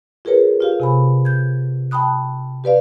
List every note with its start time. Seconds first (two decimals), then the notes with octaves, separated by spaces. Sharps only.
0.25 F4 G#4 A#4 B4 C#5
0.60 F4 G4 F5
0.80 C3 G#5 B5
1.25 G6 G#6
1.91 G5 A5 B5 D#6 F#6
2.64 G4 B4 D5 F5